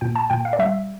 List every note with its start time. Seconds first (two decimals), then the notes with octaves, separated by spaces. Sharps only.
0.01 A#2 G5
0.16 A5
0.30 A#2 G5
0.45 F5
0.53 D5
0.59 G3 E5